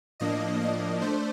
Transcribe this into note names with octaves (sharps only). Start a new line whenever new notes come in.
A2 F3 A#3 D4 D#5
D#5
A3 D4 C5